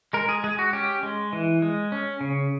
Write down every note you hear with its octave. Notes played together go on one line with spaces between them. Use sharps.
G#3 A#4
G#4
G#3 G#4
F#4
C#4 G4
G#3
E3
G#3
C#4
C#3